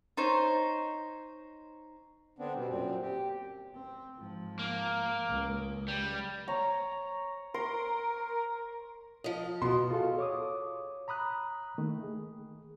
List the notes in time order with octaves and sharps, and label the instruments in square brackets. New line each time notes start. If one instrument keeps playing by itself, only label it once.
[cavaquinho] D#4 C5 C#5
[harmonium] D3 B3 C4 D4
B2 G3
F#2 A#2 C4
G4
[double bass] C4
G#2 F3
[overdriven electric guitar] A#3
[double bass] C#2
[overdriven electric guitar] G3
[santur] C#5 A#5
[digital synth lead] A#4 [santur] C6
[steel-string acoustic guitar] F3 D#5
[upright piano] B2 C6
[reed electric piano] F4 F#4 G#4 A4 F5
C#5 D6 D#6
A#5 B5 D#6 F#6
D#3 A3 A#3
G#4